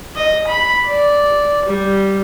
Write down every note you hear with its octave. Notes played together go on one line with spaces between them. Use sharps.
D#5
B5
D5
G3